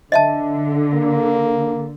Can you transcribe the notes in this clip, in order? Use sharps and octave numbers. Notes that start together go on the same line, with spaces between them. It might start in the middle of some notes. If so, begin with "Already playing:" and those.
D3 D#5 E5 A5
A#3